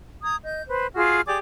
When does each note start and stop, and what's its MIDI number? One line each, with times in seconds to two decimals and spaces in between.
0.24 0.37 82
0.24 0.37 87
0.24 0.37 92
0.43 0.62 75
0.43 0.62 91
0.68 0.86 71
0.68 0.86 72
0.95 1.21 65
0.95 1.21 66
0.95 1.21 68
0.95 1.21 89
1.26 1.38 67
1.26 1.38 68
1.26 1.38 74
1.26 1.38 86